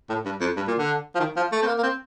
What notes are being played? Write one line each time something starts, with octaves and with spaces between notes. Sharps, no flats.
A2
G2
F2
G2
A#2
D3
F3
D#3
F3
A3
C4
A#3
A#3
C4